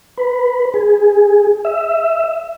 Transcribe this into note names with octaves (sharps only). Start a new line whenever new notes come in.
B4
G#4
E5